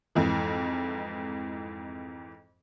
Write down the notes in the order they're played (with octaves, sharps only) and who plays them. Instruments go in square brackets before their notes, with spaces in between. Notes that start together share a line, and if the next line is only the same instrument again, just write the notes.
[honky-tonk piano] F2 G#2 E3